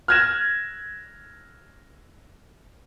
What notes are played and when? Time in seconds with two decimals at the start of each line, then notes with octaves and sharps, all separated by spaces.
0.08 F6 F#6 G#6 A#6 E7